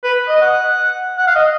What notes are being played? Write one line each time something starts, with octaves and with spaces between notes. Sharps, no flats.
B4
D#5
F#5
F#5
F5
D#5